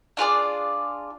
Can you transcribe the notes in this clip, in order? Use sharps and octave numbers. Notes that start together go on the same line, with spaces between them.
D4 F4 G#4 D5